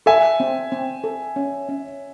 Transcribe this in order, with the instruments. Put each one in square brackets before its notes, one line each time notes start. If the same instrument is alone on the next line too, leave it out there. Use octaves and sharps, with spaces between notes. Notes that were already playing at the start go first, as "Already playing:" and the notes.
[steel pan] A4 [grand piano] E5 G#5
[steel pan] C4
C4
A4
C#4
C#4